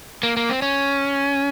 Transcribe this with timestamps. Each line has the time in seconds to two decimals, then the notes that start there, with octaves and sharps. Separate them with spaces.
0.23 A#3
0.37 A#3
0.50 C4
0.62 C#4